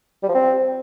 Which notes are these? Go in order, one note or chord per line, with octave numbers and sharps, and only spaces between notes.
G3
F3
C4